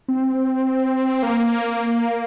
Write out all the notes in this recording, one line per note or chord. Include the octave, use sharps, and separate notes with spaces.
C4
A#3